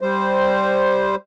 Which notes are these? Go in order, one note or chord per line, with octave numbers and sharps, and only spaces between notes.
G3 C5